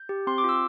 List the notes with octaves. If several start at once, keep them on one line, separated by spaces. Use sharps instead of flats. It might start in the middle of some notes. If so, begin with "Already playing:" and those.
Already playing: G6
G4
C4 C6
D6
F4 E6